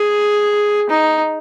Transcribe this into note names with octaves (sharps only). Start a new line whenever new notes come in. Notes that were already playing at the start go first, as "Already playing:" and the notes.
Already playing: G#4
D#4